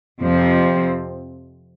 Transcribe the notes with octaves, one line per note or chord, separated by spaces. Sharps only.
F2 C3 F3 C4